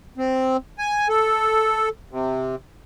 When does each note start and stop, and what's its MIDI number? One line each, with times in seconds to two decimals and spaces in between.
0.18 0.57 60
0.79 1.08 80
1.09 1.89 69
2.11 2.55 48